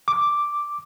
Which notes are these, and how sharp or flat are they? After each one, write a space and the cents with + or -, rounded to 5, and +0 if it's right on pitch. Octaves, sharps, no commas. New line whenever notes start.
D6 +0